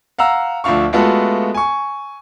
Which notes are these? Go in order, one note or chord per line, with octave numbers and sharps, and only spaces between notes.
F5 F#5 A#5 E6
D2 F3 D4 F5 C#6
G#3 A3 B3 F4 F#4 A4
G#5 C#6